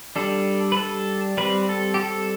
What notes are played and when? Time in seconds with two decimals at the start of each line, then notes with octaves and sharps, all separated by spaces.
0.16 G3 D4 A4
0.72 B4
0.77 A4
1.38 G3 C4 B4
1.69 A4
1.94 G4
2.00 A4